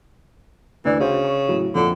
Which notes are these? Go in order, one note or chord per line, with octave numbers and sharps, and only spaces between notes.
D2 E3 D5
C#3 D4 F#4 C5
C#6
A2 F#3
A#1 F2 D3